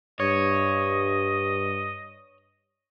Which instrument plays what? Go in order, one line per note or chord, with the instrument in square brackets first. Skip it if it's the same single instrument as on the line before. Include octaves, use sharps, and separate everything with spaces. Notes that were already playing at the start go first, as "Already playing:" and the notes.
[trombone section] G2 [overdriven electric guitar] C#5 [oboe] D#5